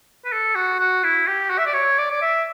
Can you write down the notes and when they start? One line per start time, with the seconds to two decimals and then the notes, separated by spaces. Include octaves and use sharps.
0.25 B4
0.32 A4
0.55 F#4
0.79 F#4
1.03 E4
1.27 G4
1.50 F#4
1.58 E5
1.66 D5
1.73 C#5
1.98 D5
2.11 D5
2.22 E5